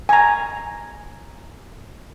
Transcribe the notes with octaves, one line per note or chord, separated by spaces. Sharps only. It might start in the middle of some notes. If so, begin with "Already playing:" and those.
G#5 A#5